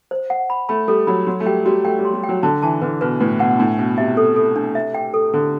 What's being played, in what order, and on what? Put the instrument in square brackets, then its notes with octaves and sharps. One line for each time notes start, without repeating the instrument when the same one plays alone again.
[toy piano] C5
F#5
B5
[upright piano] A3 [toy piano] B5
[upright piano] G3 [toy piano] A4
[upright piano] F#3 [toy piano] B5
[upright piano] F#3 [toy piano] F#4
[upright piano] A3
[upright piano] G3 [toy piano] G5
[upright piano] G3 [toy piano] F#4
[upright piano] A3 [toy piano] G5
[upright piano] G3
[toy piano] C6
[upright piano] G3
[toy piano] G5
[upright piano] F#3
[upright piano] D3 [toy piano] A5
[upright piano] E3 [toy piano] A5
[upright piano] D3 [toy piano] B4
[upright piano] B2 [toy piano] B4
[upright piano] A2 [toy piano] B4
[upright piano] B2 [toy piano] F#5
[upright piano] A2 [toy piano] D4
[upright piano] B2 [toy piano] D4
[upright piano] C3 [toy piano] E5
[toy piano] A4
A4
D4
E5
G5
A4
[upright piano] D3 [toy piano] A4